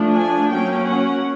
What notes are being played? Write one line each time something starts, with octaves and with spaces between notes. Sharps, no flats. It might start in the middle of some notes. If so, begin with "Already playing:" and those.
Already playing: F3 A3 D4
G#5
F#3 A#3 C#4 G5
F#5